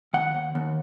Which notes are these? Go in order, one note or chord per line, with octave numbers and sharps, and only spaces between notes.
D#3 F#5
D#2
D#2